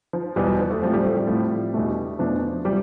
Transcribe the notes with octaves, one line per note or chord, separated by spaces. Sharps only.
F3
E2 B2 G3 B3
G3
F3
A3
A2 F3 G3 C4
G3
A3
G3
A2 F3 C4
E2 B2 A3 D4
E2 B2 F3 A3 D4
C3 F3 G3